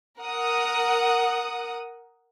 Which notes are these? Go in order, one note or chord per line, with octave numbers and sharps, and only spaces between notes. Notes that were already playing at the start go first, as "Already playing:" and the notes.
A#4 F#5 D#6